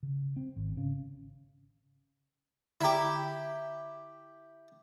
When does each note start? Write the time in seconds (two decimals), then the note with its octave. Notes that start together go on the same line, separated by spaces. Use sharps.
0.03 C#3
0.36 C4
0.57 G#1
0.77 C#3
2.81 D3 E4 G4 A#5